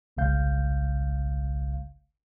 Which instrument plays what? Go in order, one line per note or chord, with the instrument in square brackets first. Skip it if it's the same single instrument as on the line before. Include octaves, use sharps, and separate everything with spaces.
[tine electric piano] G1 C2 C#3 G#3 F5 G6